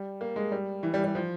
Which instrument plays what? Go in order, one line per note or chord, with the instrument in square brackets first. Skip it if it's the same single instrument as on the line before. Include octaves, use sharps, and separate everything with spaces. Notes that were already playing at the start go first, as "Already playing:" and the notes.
Already playing: [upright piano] G3
A#3
G#3
G3
E3
G3
G3
F3